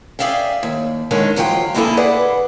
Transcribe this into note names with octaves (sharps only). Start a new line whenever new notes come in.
G#4 D5 E5 F5 G5
D#2
D3 D#3 G#3 C#4
F2 F#3 F4 F#4 G5
B2 D3 A#3 E4 G#4 A4
G#4 B4 D5 F#5